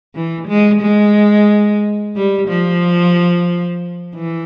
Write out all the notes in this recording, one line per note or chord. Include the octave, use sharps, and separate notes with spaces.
E3
G#3
G#3
G3
F3
E3